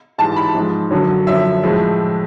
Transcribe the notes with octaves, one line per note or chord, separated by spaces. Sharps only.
G#2 E3 G3 A5
B5
G#2 F3 G#3
F#2 D3 F#3
F#2 D3 F3 E5
A2 F3 G#3